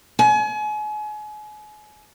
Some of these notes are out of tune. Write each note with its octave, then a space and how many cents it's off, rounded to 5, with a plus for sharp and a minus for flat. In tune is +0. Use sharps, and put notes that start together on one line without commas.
G#5 +35